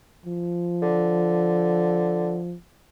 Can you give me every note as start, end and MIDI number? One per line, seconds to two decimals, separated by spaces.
0.26 2.55 53
0.82 2.38 50